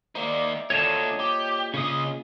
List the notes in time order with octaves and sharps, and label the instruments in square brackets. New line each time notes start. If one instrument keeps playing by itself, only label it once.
[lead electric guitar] A#3 D#4 [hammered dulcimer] C5 D5 E5
[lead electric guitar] D2 D3 [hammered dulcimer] A#2 [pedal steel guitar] C#5 D#5 A5
[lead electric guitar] G4
[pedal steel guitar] C#3 D#6 [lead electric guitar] C#4 D#5